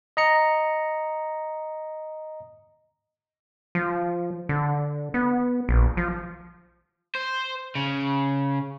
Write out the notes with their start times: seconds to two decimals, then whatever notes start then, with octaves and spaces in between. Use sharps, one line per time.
0.17 D#5 A#5 C#7
3.75 F3
4.49 D3
5.14 B3
5.69 A#1
5.97 F3
7.15 C5
7.75 C#3